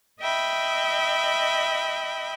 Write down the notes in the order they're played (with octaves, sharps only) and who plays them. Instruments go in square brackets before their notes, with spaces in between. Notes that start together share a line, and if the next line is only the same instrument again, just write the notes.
[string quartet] D#5 E5 G5 B5